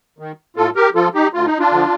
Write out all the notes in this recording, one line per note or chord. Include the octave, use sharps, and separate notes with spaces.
D#3
A2 F4 A4
G4 A#4
F3 F4 A4
D#4 G4
D2 F4
D#4
D4 F4
D3 F3